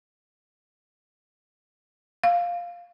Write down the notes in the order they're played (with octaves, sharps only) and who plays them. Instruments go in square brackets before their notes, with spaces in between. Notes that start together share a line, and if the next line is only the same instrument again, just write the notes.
[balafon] F5